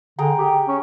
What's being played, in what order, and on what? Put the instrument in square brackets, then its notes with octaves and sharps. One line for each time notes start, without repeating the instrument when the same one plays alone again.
[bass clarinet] D3 [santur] G#4 G5 A#5
[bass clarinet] G4
C#4